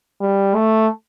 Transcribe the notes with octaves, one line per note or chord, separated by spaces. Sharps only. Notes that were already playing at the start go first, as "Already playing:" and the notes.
G3
A3